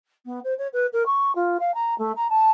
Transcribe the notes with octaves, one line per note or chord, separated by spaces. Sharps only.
B3
C5
C#5
B4
A#4
C#6
F4
F5
A#5
A3
A#5
A5